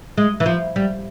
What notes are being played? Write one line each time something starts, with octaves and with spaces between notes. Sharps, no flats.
G#3
E3
F3
G3